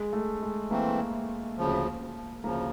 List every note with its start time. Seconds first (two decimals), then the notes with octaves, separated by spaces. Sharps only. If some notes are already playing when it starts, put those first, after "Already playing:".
Already playing: G#3
0.13 A3
0.42 G#3
0.70 E3 A3 A#3 C4
1.57 D2 C#3 F3
2.44 D2 C#3 F3 A#3